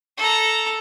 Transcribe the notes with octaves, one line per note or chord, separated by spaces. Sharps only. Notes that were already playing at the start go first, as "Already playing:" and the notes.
A4 A#5